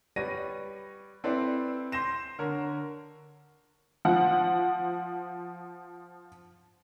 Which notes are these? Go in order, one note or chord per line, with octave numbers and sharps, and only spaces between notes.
G3 B4 C#5 D5 A#6 D#7
C4 E4 A4 B4 C5 D5
C6 G6 A#6 E7
D3 A#4 C#5
F3 F#5